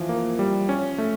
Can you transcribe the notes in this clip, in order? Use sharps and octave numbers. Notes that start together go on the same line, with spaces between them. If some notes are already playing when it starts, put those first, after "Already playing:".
Already playing: E3 F3 F4
A#3
G3
C#4
A3